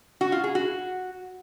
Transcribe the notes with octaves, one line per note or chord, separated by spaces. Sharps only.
F#4
F4
G#4
F#4